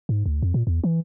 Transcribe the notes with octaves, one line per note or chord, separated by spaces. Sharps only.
G#2
D2
F2
A#2
E2
E3